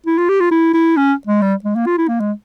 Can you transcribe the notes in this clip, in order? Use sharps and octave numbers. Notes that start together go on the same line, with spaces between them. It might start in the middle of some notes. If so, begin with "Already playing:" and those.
E4
F4
G4
F4
E4
E4
C#4
G#3
G3
G#3
A#3
F4
E4
A#3
G#3